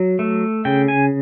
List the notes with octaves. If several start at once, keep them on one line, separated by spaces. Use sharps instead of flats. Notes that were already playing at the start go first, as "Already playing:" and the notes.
Already playing: F#3
A3
C#3 G5
G#5